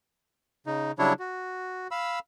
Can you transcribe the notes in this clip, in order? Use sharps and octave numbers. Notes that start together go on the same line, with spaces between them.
C#3 D#4
C#3 F#3 G3 D4 E4 C#5
F#4
F5 B5 E6